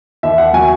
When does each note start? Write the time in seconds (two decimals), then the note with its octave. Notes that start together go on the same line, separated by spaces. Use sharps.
0.23 D#2 E5
0.38 F#5
0.53 F#3 G#5